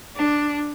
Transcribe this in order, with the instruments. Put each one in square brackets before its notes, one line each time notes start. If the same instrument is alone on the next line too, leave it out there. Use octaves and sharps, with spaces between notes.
[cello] D4